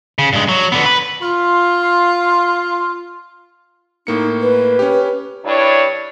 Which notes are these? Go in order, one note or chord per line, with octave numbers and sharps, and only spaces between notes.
C#3
G2 G#3
F#3
D3 B3
B4
F4 C6
A2 A#3 D#4 C#7
B4
C#4 G4
G2 D4 E4 C#5